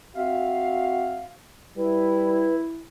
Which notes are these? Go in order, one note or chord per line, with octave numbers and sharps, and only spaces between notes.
C4 F#4 E5 F5
G3 E4 B4